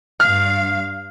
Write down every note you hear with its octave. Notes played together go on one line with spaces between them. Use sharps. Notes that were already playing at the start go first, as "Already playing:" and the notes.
G2 F5 F6